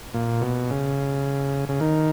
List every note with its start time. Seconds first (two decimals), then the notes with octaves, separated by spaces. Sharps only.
0.14 A#2
0.42 B2
0.70 C#3
1.69 C#3
1.80 D#3